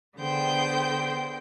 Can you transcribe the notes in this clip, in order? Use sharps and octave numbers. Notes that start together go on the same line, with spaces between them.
D3 B3 G#4 C5 G5 G6